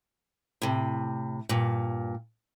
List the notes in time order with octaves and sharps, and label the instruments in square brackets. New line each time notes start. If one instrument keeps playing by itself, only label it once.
[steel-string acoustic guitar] A2 C3
G2 A#2